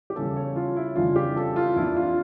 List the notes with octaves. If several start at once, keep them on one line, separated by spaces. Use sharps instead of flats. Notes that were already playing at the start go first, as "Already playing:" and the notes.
G4
E2 C#3 E3 G3 C#4 A4
C#5
F4
E4
F2 C#3 E3 G3 D4 F4
G4
A4
F4
F2 E3 A#3 D4 E4
F4